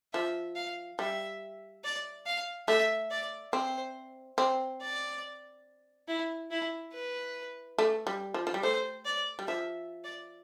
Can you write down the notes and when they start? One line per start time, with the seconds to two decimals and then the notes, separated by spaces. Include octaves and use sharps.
0.13 F3 E5
0.56 F5
0.99 G3 E5
1.84 D5
2.26 F5
2.68 A3 E5
3.11 D5
3.53 C4 C5
4.38 C4 C5
4.81 D5
6.08 E4
6.51 E4
6.93 B4
7.78 A3
8.07 G3
8.34 F3
8.47 F3
8.54 G3
8.63 A3 C5
9.05 D5
9.39 G3
9.48 F3 E5
10.04 D5